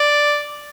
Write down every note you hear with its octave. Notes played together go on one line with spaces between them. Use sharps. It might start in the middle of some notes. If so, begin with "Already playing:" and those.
Already playing: D5